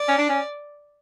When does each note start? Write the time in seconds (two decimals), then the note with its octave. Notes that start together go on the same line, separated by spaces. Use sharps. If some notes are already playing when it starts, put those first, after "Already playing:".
Already playing: D5
0.08 C#4
0.18 D4
0.29 C#4